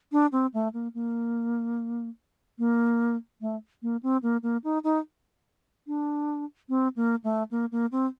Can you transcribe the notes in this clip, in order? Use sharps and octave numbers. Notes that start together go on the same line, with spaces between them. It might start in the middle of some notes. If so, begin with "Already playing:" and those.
D4
C4
A3
A#3
A#3
A#3
A3
A#3
C4
A#3
A#3
D#4
D#4
D4
C4
A#3
A3
A#3
A#3
C4